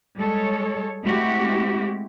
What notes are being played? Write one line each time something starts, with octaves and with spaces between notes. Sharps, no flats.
G3 G#3 A4 C#5
G#3 A3 C4 E4 F#4 G4